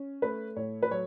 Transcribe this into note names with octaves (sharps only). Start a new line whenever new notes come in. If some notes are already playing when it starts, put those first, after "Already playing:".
Already playing: C#4
A3 B4
A2 C#5
B4
F#3 C#5